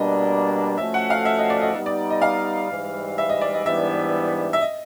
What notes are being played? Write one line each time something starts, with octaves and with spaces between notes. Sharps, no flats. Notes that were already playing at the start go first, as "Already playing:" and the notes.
Already playing: B2 G3 A#3 D4 D#5
F3 A3 C#4 F#4 A4 E5
F#5
F5
E5
D#5
D5
D#5
G3 B3 D#4
D5
D#5
F5
G#2 E3 G3
E5
D#5
D5
D#5
G#2 E3 G3 B3 D4 E5
E5
D#5